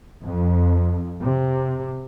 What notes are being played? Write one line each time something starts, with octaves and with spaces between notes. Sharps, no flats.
F2
C3